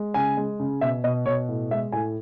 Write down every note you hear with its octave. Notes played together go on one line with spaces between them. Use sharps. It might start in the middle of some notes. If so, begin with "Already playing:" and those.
Already playing: G#3
C#3 G#5
G#3
C#3
B2 E5
B2 D#5
B2 C#5
A2
G#3 E5
A2 G#5